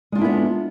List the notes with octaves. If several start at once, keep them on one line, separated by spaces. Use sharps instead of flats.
G#3 B3 D4 E4 F4